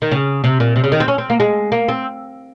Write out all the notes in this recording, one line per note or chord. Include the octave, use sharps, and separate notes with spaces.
D#3
C#3
C3
A#2
C3
C#3
D#3
C4
C#4
C4
A#3
G#3
A#3
C4